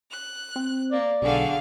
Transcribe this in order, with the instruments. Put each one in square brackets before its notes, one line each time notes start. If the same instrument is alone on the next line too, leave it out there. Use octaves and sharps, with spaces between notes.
[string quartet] F#6
[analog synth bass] C4
[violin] A#3 [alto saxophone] D5
[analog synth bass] B1 [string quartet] D3 F#4 A4 [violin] G#4 F5